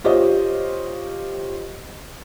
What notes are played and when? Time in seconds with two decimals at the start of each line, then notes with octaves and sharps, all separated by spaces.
0.04 F4 G4 C5 C#5 D#5